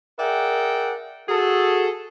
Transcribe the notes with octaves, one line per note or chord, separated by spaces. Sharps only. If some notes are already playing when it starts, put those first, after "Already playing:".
G#4 A#4 D5 E5 F#5 G5
F#4 G#4 A4